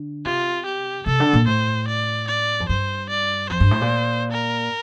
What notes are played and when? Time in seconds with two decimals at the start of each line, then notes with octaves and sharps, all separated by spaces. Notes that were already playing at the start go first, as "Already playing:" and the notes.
Already playing: D3
0.25 C3 F4
0.66 G4
1.06 C3 A4
1.20 D3
1.33 A#2
1.47 A2 C5
1.88 D5
2.28 D5
2.60 F2
2.69 G2 C5
3.10 D5
3.50 F2 C5
3.60 G2
3.71 A2
3.81 A#2
4.32 A#4